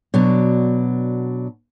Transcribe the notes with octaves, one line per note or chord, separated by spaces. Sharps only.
B2 F#3 D4